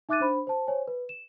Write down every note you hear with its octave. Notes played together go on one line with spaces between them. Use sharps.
D#4 E5 D6 F#6 A6 D#7
D4 C5 B5
C5 A5
C5 C#5 G#5
B4
E7